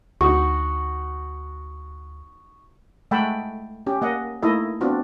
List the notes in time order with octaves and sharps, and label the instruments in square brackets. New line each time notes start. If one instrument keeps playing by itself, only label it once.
[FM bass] D2 [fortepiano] D#4 F#4 [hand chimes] C#6 D#6
[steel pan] G#3 A3 F#5 G5 A5 B5
C#4 G4
A#3 D#5 F#5
A3 A#3 D#4 E4 A4 D#5
B3 C4 D4 F4 F#4